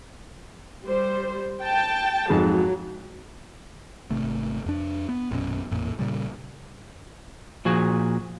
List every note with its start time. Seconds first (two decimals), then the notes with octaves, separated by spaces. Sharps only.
0.84 G3 C5
1.62 G5 A5
2.29 F2 G#2 F#3 G#4
4.10 G#1 C3 A3
4.66 F2 D4
5.09 B3
5.31 A#1 F#2 B2 C#4
5.71 A1 F2 A#2
5.99 A#2 C#3 G3
7.65 A#2 F3 F#4 G#4